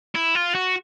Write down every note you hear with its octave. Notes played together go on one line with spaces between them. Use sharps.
E4
F4
F#4